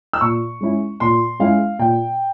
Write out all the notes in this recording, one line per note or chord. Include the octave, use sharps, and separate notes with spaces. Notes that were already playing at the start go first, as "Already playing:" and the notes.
E6
A#2 C#6
G#3 C#4 E4
A#2 C6
G#3 C#4 E4 F5
A#2 G5